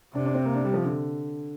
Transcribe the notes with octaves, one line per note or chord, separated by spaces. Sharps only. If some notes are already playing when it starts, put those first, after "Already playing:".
C3 D4
D4
C4
A#3
D4
G3
F3
D3